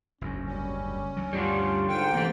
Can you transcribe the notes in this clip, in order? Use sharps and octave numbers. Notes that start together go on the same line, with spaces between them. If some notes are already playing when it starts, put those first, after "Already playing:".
F#1 D2 G#2 C#4
G3 C#4
D2 F#3
D2 G2 G3 D4 F4 F#4
G#2 D3 G5
C3 E3 A3 A#3